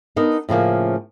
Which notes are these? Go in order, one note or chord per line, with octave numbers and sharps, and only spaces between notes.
B3 D4 D#4 A#4
A2 C#3 F3 A#3